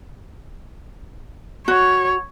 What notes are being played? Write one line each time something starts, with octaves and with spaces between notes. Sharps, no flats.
F#4 C#5